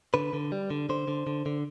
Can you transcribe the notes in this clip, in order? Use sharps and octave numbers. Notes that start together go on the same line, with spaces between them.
D3 B4
D3
G3
D3
D3 C5
D3
D3
D3